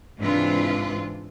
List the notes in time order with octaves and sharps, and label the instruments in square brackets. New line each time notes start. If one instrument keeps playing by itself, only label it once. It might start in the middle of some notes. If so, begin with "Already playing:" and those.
[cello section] G#2 C3 E3 D4 F4